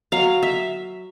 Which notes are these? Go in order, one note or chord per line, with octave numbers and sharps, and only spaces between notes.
F#3 F5
E5